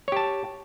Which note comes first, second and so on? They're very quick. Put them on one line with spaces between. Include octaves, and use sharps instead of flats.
C#5 G4 A5